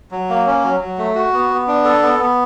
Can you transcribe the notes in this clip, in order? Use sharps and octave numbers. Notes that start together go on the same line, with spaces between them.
F#3
A#3
C#4
F#3
F#3
A3
F#4
B3
B3
D4
A4
B3
B3